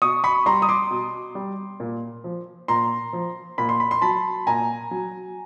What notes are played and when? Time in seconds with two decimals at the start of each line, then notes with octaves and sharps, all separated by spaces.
0.02 B2 C#6 D#6
0.24 B5 C#6
0.46 G3 A#5 C6
0.62 D#6
0.69 C6 D6
0.91 B2
1.35 G3
1.80 A#2
2.24 F3
2.68 A#2 A#5 C6
3.13 F3
3.58 A#2 B5
3.69 C6
3.80 B5
3.91 C6
4.02 F#3 A5 B5
4.47 A#2 G#5 A#5
4.91 F#3